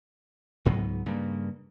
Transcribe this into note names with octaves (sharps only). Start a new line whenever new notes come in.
C#2 G#2 F#3 B3
G2 C#3 A#3